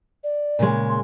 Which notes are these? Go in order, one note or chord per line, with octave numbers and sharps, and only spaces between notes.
D5
A#2 C#3 G#3
C6